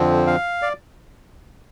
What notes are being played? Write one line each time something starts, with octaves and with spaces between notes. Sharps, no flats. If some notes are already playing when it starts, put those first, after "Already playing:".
Already playing: F2 D3 F3 C4
F5
D5